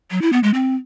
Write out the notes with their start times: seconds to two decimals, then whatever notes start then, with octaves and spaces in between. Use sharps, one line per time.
0.11 F#3
0.22 E4
0.33 B3
0.43 G#3
0.54 C4